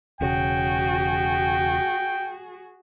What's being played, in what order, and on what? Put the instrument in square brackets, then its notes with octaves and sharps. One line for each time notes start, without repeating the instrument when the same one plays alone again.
[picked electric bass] E1 C#3 [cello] F#4 G#4 [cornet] G5